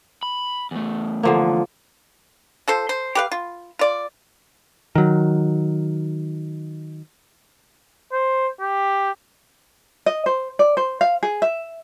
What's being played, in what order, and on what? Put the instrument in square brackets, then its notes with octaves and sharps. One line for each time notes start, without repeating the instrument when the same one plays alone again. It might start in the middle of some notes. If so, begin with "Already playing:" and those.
[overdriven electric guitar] B5
E2 A3
[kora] D3 F3 A#3
[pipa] F3 A4 C5
C5
G4 B4 F5
F4
F4 D5
[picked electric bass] D#3 F#3
[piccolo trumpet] C5
G4
[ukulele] D#5
C5
D5
C5
F5
G#4
E5